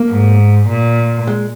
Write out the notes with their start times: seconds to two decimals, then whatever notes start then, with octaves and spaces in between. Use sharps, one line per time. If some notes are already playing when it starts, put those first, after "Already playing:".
Already playing: A#3
0.10 G#2
0.68 A#2
1.27 G#3